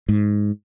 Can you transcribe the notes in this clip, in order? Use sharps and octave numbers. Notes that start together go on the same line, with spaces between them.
G#2